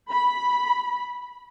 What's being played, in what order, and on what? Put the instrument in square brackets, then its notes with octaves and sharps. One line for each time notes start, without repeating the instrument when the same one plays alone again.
[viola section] B5